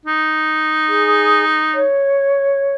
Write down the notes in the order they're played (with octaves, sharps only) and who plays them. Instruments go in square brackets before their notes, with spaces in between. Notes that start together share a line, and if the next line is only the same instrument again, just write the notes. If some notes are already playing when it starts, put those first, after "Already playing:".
[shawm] D#4
[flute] G#4
C#5